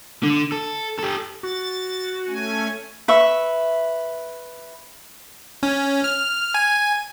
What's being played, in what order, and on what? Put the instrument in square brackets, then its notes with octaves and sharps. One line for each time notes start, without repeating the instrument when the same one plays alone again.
[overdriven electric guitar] D3
A4
G4 A4
[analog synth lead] F#4 [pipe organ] A6
[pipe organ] A3 C#4 G#5
[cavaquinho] B4 E5 C#6
[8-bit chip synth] C#4
F6
G#5